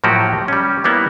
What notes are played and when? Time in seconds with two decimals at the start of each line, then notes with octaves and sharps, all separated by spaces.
0.04 A2 F3 F#3 A#3 F#4 G4
0.48 G3 C#4
0.84 G3 A#3 B3 E4